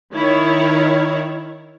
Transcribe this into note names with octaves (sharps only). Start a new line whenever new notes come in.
D#3 E4 C#5